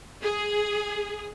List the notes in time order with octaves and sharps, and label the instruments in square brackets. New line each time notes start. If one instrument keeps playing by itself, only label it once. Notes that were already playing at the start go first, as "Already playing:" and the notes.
[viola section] G#4